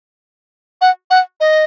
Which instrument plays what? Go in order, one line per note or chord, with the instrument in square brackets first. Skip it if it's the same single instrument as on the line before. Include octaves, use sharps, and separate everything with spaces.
[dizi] F#5
F#5
D#5